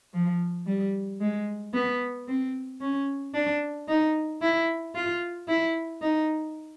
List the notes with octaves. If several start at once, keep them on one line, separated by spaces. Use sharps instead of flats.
F3
G3
G#3
B3
C4
C#4
D4
D#4
E4
F4
E4
D#4